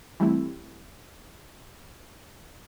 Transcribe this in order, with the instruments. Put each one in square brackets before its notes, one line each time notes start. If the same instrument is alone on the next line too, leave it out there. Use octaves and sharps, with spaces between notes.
[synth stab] E3 G3 A3 C4 E4